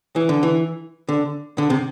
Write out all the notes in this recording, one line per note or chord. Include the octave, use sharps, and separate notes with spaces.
E3
D3
E3
D3
D3
C3